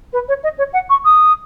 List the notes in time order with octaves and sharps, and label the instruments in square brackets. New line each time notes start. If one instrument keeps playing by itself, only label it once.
[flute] B4
C#5
D#5
C#5
F#5
C#6
D#6